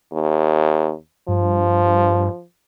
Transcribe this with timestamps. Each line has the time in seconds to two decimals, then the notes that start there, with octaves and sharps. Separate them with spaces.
0.13 D#2
1.28 G2 F3